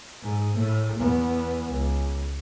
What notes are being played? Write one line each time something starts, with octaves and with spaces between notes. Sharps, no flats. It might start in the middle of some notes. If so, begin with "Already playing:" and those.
G#2
A2 A3
E2 B3
C#2